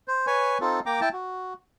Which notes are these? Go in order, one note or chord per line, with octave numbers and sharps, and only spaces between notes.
C5
B4 C#5 G#5
C4 D#4 F4 A4
A#3 G5 A#5 D6
E4 G5 A5
F#4